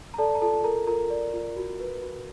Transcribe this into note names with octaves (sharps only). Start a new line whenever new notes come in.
A#5
A4 D5 A5
A#5
F4 A4 A5
A4 A#4 A#5
F4 A#4 A#5
D5
F4
F#4
B4
F#4